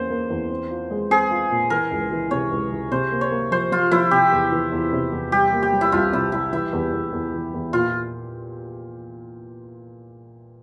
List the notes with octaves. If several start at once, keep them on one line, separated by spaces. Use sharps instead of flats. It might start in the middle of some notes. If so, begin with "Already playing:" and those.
Already playing: E2 A#3 C#4 C5
A#3
E2
C4
F4
G#3
C4 G#4
F4
A#2
E3 A#4
C#2
E3
C3 C#5
C#2
C#2
C3 C5
A#3
C#5
A#3
F3 C5
F3 F4
F3 E4
C3 G4
E2
E3
E2
C3
E2
G3 G4
A#3
G4
G3
E4
C2 F4
C3 E4
G3 E4
E3 E4
E2
E2
E2
E3
E2
A#2 F4